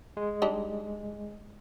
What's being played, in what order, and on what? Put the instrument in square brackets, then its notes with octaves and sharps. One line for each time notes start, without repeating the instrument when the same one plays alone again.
[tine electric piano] G#3
[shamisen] G3 D4 D#4